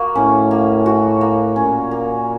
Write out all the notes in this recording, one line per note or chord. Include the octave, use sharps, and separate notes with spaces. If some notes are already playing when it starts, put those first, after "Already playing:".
Already playing: A#3 F#4
A2 C#4
A#3
F#4
A#3
A#2 C#4
A#3